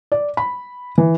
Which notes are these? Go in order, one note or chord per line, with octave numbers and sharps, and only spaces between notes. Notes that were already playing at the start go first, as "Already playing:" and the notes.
D5
B5
E3